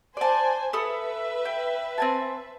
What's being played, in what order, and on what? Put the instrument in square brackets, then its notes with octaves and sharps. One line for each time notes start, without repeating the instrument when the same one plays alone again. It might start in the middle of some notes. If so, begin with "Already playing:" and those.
[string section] C5 G#5 [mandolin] D5 A5
[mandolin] A4 B5 D#6 [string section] B4 E5
[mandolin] G5
C4 G#5 A5